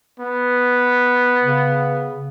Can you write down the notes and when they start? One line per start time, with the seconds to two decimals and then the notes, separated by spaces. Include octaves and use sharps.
0.20 B3
1.43 C#3